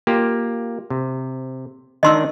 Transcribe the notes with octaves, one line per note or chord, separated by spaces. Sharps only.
A#3 F4 G4
C3
D#3 D4 D#4 D#5 C6 E6